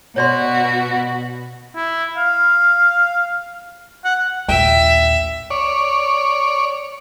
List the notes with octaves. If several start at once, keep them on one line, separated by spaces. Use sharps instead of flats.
B2 F#4 C#5 D5 C6
E4
F5
F#5
A#1 D#2 E5 G5
C#5 D5